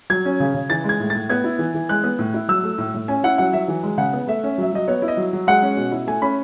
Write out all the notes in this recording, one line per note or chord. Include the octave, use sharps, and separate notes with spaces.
F#3 G#6
C#4
C#3
C#3
E3 A6
G#3
G#6
A2
A2 A6
B3 G#6
E4
E3
E3
G#3 F#6
B3
A2
E4
F#3 E6
A3
A2
A2
C#4 G#5
E4 F#5
F#3 F#5
F#3 E5
E3
G#3
C#3 F#5
B3
A3 E5
C#4
F#3 E5
F#3 D#5
B3 C#5
E4
D#5
F#3
F#3
G#3 F#5
C#4
B2
E4
A3 G#5
C#4 B5